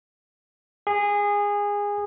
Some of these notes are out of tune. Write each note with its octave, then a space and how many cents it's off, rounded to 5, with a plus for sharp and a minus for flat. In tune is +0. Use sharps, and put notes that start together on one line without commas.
G#4 -20